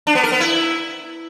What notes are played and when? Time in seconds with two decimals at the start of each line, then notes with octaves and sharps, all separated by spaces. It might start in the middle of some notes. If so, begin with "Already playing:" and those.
0.07 D4
0.15 B3
0.23 A#4
0.32 B3
0.40 E4